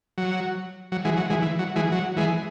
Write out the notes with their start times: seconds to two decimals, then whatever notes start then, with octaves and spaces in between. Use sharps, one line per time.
0.18 F#3
0.92 F#3
1.05 E3 G#3
1.17 F#3
1.30 E3 G#3
1.42 E3
1.59 F#3
1.76 E3 G#3
1.92 F#3
2.17 E3 G#3